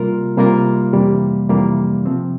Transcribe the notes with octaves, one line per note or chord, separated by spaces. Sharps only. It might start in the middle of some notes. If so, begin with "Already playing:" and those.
Already playing: C3 G3 A#3 F4 A#4
C3 G3 A#3 F4 A#4
F2 C3 E3 G3 A#3
F2 C3 E3 G3 A#3
C3 F3 C4